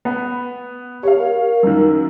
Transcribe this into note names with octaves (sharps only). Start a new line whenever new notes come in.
B3
G4 C#5 F5
A#4
F#2 D#3